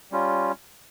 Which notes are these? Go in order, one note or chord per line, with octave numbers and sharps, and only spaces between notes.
G3 C#4 F4